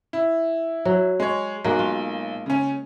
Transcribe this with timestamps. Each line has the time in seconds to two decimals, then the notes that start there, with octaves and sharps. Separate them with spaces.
0.13 E4
0.85 F#3
1.20 G#3 C#5
1.65 B1 G#3 A#3 F#4
1.79 F4
2.46 C#3 C#4